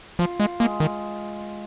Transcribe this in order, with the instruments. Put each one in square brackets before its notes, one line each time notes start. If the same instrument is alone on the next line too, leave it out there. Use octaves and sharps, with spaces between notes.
[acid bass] F3 [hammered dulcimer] F4
[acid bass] G#3
[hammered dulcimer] G#3 [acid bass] A#3
[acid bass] D#3